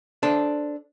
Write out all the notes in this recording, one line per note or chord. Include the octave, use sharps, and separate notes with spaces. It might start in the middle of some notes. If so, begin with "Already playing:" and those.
D4 A4 C5